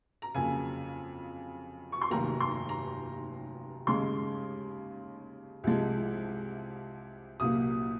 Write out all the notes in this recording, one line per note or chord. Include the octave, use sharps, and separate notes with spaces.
A#5
F2 C#3 F#3 A#3 G#5
C#6
C6
F1 D#2 D#3 F#3 A#3 A#5
C6
A#5
D#2 C#3 G#3 C6
C2 C3 F3 G#3
C2 A#2 F#3 A#3 D#6